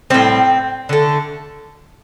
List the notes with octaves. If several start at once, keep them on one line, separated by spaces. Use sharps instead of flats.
A2 G3 C4
D3 A3